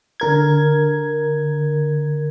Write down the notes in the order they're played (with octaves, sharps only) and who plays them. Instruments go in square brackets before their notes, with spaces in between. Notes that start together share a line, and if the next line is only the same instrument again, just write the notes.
[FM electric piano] D3 A#4 G#6